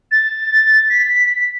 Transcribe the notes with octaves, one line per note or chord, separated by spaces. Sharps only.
A6
B6